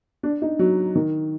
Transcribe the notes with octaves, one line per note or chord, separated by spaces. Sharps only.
D4
D#4
F#3
D#3